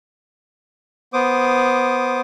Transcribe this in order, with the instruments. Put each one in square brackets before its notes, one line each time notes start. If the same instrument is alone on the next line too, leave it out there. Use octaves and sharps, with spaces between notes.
[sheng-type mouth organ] B3 C5 D6 D#6